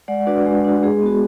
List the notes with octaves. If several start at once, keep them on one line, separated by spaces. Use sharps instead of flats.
G#3 D5 F#5
D4 F#4 B4 D5
G#3
D4 F#4
G#3 G#4
B3 F#4